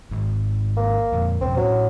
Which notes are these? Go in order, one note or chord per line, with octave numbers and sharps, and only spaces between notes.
G#1
A#3
F2 A#2
C2 F2 B2 C4
A2 F#3 C#4